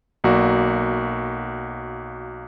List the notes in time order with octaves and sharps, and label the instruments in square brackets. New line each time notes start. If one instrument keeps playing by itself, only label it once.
[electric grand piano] B1 A#3 F#4 D5